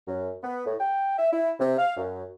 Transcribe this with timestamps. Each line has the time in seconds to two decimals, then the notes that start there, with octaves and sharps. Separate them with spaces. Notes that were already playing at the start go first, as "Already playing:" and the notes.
0.07 F#2
0.43 B3
0.66 A2
0.79 G5
1.18 E5
1.32 E4
1.59 C3
1.78 F5
1.97 F#2